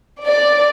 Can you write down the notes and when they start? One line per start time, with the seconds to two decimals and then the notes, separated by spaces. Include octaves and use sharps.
0.25 D5